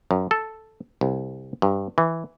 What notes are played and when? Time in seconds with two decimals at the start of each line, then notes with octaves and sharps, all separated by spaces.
0.11 F#2
0.31 A4
1.01 C2
1.62 G2
1.98 E3